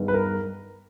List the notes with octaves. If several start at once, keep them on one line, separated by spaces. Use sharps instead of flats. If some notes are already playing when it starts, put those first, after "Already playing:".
Already playing: G2 D#3 G#3 B3
B4
A#4